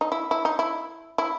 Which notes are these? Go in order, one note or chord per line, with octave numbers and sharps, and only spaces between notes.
D#4
E4
E4
D#4
E4
E4